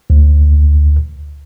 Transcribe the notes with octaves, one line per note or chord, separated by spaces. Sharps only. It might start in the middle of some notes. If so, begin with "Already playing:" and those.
D2